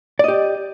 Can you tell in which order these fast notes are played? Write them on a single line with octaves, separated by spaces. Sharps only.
D5 D#5 G4